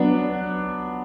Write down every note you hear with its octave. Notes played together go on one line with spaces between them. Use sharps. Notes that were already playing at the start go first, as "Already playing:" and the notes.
Already playing: F#3 B3 D4